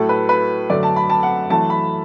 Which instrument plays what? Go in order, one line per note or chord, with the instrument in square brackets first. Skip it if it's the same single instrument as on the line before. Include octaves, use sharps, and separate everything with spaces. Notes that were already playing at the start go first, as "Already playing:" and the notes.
Already playing: [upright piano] A2 F#3 A3 A4
B4
B4
F#2 D3 F#3 A3 D5
A5
B5
A5
F#5
F#2 E3 A3 A5
B5